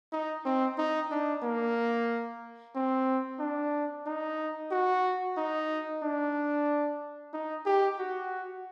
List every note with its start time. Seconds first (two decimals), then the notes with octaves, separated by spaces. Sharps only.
0.13 D#4
0.45 C4
0.78 D#4
1.11 D4
1.43 A#3
2.75 C4
3.40 D4
4.06 D#4
4.71 F#4
5.37 D#4
6.03 D4
7.33 D#4
7.66 G4
7.99 F#4